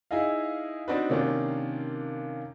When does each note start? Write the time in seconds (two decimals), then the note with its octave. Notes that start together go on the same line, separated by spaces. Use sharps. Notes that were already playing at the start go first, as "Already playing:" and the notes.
0.11 D#4 E4 G#4 D#5 F5
0.88 C4 D4 D#4 F#4 B4
1.09 C3 D#3 A#3 C#4 D4 F4